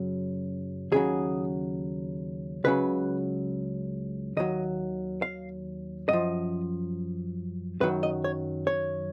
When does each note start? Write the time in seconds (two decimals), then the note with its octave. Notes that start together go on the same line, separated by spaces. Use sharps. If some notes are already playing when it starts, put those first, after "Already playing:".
Already playing: F#2 C#3 F#3
0.92 D#2 C#3 F#3 G#4
2.64 C#2 C#3 F#3 B4
4.37 D#2 D#3 F#3 D#5
5.22 F5
6.09 F#2 F3 D#5
7.81 F#2 D#3 F#3 B4
8.03 D#5
8.24 C#5
8.67 C#5